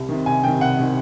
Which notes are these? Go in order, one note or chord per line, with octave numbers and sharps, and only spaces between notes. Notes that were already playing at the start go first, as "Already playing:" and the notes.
Already playing: C2
C3 D#3
C2 G#5
C3 D#3 G5
C2 F#5
C3 D#3